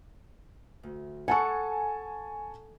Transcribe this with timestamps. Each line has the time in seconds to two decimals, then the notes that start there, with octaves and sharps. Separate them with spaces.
0.83 D2
1.28 A4 F#5 G#5 A5 C#6